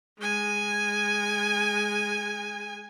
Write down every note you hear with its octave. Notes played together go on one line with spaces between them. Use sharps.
G#3 G#5